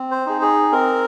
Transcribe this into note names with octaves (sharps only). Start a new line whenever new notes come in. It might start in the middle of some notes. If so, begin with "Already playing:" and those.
Already playing: C4
C5
D#4 G#4
G#4
C4 A#4